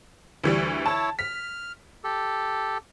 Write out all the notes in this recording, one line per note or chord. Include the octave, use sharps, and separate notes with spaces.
D2 E3 G3
E4 C#5 A5
F6 B6
G4 A4